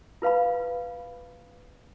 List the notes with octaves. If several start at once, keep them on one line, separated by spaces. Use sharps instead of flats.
F4 B4 F5 B5